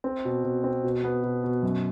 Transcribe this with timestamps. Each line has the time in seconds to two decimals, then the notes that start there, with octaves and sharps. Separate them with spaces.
0.04 C4
0.25 B2
0.44 B2
0.64 C4
0.84 B2
1.04 B3
1.23 B2
1.44 B2
1.63 F#2